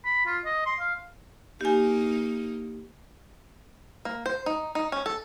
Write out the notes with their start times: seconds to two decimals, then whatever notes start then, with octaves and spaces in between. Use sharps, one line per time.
0.05 B5
0.26 F4
0.45 D#5
0.65 C6
0.80 F5
1.61 A#3 D#4 G4 G#5
4.05 A#3
4.26 C5
4.46 D#4
4.75 D#4
4.92 C#4
5.06 A4